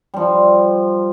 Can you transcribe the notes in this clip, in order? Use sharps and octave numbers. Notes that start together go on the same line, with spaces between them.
F3 G3